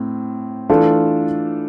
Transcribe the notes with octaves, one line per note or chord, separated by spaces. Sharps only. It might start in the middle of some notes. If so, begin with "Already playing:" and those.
Already playing: A2 C4
E3 A3 D4 F4 A4